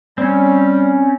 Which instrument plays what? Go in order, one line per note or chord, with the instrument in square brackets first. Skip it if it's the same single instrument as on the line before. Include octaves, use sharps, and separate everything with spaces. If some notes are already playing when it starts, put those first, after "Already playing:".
[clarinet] G3 [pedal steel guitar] C4 C#4